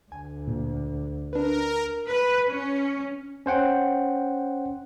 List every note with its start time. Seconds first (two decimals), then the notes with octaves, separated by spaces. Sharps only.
0.12 D2 G#5
0.48 A#2
1.33 D4 A#4 B4
2.08 B4
2.48 C#4
3.46 C#4 C5 F#5 G5